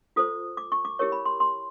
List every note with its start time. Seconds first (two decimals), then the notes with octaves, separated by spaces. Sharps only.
0.16 F4 A4 C5 D#6
0.57 D6
0.72 C#6
0.85 D6
0.99 E4 G4 A#4 C#5 C#6
1.12 B5
1.25 C6
1.40 C6